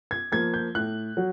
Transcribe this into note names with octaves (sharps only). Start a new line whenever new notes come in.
G#6
F3 A#3 G#6
G6
A2 F#6
F#3